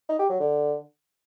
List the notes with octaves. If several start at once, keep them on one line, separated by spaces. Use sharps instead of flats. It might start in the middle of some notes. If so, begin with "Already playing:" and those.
D#4
G4
F#3
D3